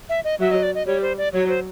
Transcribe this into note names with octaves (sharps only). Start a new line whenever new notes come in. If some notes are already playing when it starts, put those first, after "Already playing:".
E5
D#5
F#3 E5
D#5
D5
D#5
G3 C#5
C5
D5
F#3 C#5
C5